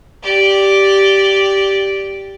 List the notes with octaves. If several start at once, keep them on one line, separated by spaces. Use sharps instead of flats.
G4 D5